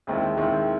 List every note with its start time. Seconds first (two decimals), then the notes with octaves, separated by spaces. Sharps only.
0.07 D#2 D#3 G#3 C4 E4
0.37 D#2 D#3 G#3 C4 E4